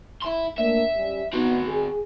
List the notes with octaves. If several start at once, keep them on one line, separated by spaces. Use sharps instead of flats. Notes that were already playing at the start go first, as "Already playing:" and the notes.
E4 C6
A3 A#3 D4 E5
G3 C#4
B3 C4 D#4 F#4
G#4